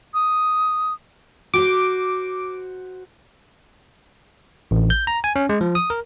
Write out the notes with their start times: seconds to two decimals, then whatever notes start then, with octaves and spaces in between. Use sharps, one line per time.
0.14 D#6
1.54 F#4 C5 D6
4.71 A1
4.90 G6
5.07 A#5
5.24 G#5
5.36 C#4
5.49 G#3
5.61 F3
5.75 D#6
5.90 A#4